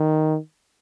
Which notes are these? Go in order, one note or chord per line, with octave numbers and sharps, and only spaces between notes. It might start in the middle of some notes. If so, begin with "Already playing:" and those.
Already playing: D#3